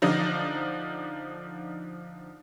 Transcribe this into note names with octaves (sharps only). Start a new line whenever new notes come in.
D3 F3 D4 D#4